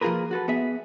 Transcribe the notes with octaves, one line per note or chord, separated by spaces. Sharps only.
F3 A#3 F4 G#4 A#4 B4
F#4 A4 B4
B3 G#4 E5